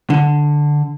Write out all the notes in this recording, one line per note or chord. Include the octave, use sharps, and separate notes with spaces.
D3